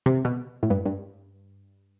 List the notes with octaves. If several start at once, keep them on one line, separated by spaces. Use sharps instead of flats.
C3
B2
A2
G2
G2